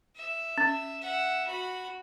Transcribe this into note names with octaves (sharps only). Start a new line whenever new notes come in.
E5
C#4
E5 F#5
F#4 B5